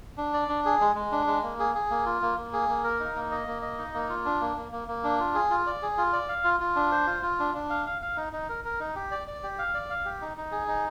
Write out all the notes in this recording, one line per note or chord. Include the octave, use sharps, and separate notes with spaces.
D4
D5
D4
G#4
G#3
G#3
D4
G#3
A#3
G#4
G#4
A#3
F4
A#3
A#3
G#4
A#3
A#4
D#4
A#3
D#5
A#3
D#5
D#4
A#3
F4
D4
A#3
A#3
A#3
A#3
D4
F4
G#4
F4
D5
G#4
F4
D5
F5
F4
F4
D4
C5
F4
F4
D4
D4
F5
F5
F5
D#4
D#4
A#4
A#4
D#4
G4
D5
D5
G4
F5
D5
F5
G4
D#4
D#4
G#4
D#4